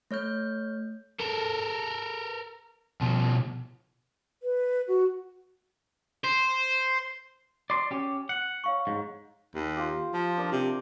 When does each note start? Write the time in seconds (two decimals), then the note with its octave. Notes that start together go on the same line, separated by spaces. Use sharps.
0.11 A3 C#5 F6 G6
1.20 A4 A#4
3.01 B2 F3
4.43 B4
4.88 F#4
6.24 C5
7.70 D5 C6
7.91 C#4 G4
8.29 F#5
8.64 C#5 F5 C#6
8.87 G#2
9.55 D#2
9.77 F4 G4
10.14 F3
10.37 D4 A#4
10.52 C3